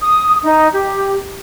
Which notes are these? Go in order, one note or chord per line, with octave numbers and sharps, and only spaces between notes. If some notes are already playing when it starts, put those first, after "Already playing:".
D#6
D#4
G4